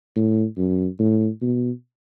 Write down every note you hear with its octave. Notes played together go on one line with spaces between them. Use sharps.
A2
F#2
A2
B2